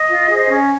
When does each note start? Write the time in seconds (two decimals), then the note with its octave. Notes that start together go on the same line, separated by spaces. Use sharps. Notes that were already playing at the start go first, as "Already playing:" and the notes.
Already playing: D#5
0.09 F4
0.30 G#4 C5
0.50 C#4